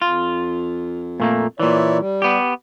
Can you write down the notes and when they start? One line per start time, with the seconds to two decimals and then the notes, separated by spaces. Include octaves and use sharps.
0.02 F2 F4
1.20 A#2 A3 A#3
1.60 A#2 E3 C#5 D5 E5
1.99 G3
2.22 B3 G4